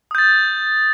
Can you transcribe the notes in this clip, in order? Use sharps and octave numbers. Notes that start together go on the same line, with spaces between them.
D#6 G6 A6